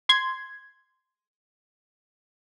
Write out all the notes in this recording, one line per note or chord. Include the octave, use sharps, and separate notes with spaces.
C6 G#6